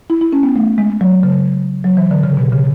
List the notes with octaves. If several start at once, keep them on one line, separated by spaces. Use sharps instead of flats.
E4
E4
C#4
B3
A3
G#3
F#3
C#3
F#3
E3
D3
C#3
B2
C#3